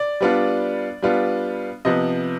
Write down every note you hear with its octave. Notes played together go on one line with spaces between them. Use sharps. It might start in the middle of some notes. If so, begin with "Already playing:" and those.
Already playing: D5
G3 B3 D4 F4
G3 B3 D4 F4
C3 F3 B3 D#5